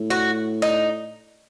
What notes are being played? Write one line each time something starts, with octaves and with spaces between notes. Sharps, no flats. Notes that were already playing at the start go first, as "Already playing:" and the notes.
Already playing: A2
F#4
D#4